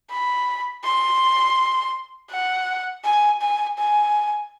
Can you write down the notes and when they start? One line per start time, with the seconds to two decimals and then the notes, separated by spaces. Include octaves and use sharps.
0.10 B5
0.84 C6
2.31 F#5
3.04 G#5
3.41 G#5
3.78 G#5